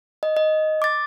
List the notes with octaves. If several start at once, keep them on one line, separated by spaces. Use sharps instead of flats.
D#5
D#5
D6 A6